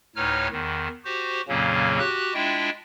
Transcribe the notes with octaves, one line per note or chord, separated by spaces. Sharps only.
D2 A2 D#4 B4 C#5 F6
E2 D#3
F#4 G4 C5
F2 A#2 C#3 F#3 A#3 C#4
F#4 G4 F#6
G#3 D4 E4 F4 E5 G5